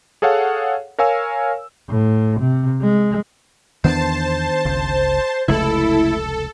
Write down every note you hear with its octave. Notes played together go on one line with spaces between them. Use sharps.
G#4 A4 C#5 F5 F#5
A#4 C#5 F5 G#5 E6
A2
C3
G#3
E2 D#3 B3 D4 C5 A5
G1 C#2 C#3
F1 C#2 C#3 A3 E4 A4